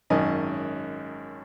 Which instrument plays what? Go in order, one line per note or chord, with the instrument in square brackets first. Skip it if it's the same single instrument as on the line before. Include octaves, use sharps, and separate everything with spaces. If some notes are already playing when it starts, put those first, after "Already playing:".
[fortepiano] G#1 F#2 D#3 D#5